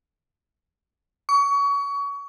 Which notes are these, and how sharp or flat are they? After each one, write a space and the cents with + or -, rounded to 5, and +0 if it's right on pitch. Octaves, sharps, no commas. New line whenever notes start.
C#6 +30